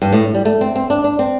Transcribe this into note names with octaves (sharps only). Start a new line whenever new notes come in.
G2
A2
G3
A3
C4
C4
D4
D4
C4